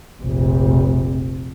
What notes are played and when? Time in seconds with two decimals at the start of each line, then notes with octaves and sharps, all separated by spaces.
0.22 F1 A#1